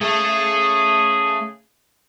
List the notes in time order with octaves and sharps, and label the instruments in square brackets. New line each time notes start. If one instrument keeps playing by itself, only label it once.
[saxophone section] C#3 G#4 [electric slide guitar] A3 A4 E5